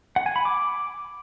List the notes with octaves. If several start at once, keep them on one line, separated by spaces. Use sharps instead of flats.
F#5
G#5
B5
D6